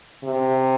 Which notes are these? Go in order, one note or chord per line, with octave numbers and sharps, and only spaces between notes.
C3